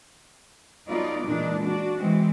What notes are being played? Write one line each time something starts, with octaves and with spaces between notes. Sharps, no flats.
F#3 A3 B3 D#4 F4 D5
A#2 E3 G#3 D4 D#4
D4 F#4
E3 G#3 C4